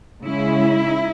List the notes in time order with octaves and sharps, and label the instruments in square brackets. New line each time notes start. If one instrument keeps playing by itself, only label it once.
[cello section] C#3 G#3 C#4 E4